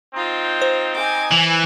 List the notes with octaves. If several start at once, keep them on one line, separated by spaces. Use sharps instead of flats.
C4 D#4 F4
C5
G#5 D6
E3